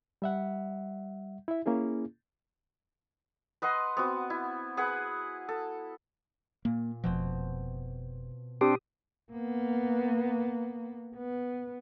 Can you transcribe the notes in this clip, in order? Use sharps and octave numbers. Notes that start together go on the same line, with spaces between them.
G3 E5 F#5
E4 E5
A#3 C#4 E4 G#4
B4 D#5 F#5 C6
B3 C4 F#4
E4
G#4 B4 F#5
A4
A#2 A#3
F1 B2 F3 C4
C4 D4 G4 D#6
A#3 B3
B3